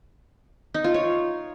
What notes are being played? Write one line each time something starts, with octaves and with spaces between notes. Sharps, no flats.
D#4
F4
C#5